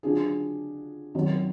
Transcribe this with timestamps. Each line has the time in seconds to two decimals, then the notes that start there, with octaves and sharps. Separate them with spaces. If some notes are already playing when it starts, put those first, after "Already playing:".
0.03 D3 F#3 D4 F4 G#4
1.15 G#1 F#2 D#3